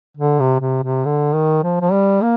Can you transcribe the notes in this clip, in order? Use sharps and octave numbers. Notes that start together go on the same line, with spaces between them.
D3
C3
C3
C3
D3
D#3
F3
F3
G3
A#3